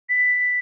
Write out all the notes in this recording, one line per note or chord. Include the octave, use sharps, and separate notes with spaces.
B6